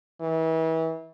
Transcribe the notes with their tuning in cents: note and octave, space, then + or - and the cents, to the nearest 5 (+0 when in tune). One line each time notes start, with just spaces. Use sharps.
E3 -35